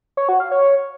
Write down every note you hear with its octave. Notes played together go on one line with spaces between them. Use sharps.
C#5
F#4
F5
C#5